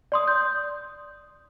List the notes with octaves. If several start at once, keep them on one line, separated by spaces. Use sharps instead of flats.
D5 C6 D#6
G6